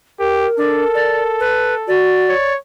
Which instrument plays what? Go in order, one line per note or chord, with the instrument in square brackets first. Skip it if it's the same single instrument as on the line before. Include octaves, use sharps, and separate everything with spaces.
[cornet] G4 [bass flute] A#4
[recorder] D4 [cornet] A4
[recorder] D5
B4
[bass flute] F#4 [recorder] D5
[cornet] C#5